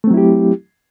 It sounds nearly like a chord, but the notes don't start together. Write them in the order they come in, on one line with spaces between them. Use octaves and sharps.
A3 C4 F#3 E4 G4